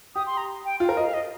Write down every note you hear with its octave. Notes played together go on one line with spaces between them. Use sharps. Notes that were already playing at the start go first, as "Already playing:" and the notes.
G4 D#6
C6
A#5
G5
F4 F5
A#4
D#5
F5
D#5